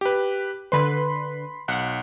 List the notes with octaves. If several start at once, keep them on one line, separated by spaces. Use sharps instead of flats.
G4 B4
D3 B4 B5 C6
B1 F#5